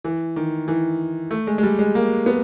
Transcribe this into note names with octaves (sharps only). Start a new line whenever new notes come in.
E3
D#3
E3
A3
G#3
G#3
G3
G#3
A#3
B3